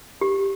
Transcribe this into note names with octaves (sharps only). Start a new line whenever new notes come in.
G4